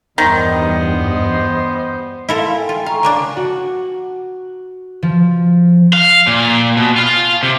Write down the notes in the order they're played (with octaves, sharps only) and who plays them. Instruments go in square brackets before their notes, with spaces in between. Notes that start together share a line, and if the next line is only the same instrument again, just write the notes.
[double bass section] E2 G2 [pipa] D#3 [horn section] G3 C5 D#5 [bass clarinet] B3
[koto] E4 A4 A#4 [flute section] F5 C6
[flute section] A4 G5 G#5
[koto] F4
[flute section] F4 A#5 C#6 [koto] F5
[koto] C#3 A#3 D4
[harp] F#4
F3
[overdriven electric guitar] F5
A#2
B2
F4 F5
C3